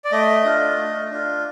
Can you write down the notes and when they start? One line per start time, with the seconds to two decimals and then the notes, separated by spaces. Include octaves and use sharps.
0.04 D5
0.12 A3 D#5
0.44 D4 F4
0.77 A3
1.11 D4 F4